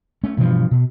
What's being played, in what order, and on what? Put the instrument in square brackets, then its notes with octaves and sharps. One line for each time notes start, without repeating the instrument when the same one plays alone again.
[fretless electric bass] A3 C#4
G2 B2 E3 F3
B2